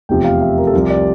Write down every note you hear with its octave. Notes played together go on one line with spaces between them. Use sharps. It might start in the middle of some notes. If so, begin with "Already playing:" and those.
F1 E2 C3 F3 G5
F5
E5
A#4
A4
C2 C3 F3 A#4
D5